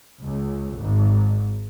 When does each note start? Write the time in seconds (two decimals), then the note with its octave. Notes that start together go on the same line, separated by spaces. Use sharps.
0.25 C#2
0.77 G#1